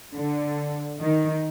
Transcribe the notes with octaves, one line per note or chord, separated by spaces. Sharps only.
D3
D#3